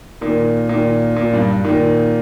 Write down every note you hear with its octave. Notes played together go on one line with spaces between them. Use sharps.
A#2 D#3
A#2 D#3
A#2
G2
A#2 D#3